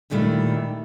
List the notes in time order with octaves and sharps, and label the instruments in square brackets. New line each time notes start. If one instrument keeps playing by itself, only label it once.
[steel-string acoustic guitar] D#2 A#2 D#3 G3 A3 E4